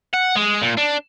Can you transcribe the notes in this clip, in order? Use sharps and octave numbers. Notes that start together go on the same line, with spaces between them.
F#5
G#3
A#2
D4